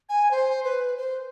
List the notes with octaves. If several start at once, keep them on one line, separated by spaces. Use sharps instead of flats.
G#5
C5
B4
C5